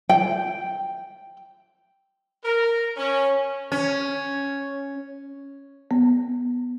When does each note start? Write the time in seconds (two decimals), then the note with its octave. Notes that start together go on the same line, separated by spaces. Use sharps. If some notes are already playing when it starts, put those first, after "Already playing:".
0.09 G5
2.45 A#4
2.97 C#4
3.72 C#4
5.91 B3